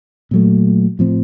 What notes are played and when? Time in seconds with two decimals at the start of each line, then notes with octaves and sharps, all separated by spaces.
0.31 A#2 F#3 A3
0.99 A2 F3 C4